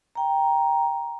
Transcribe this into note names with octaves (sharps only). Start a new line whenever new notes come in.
G5 A#5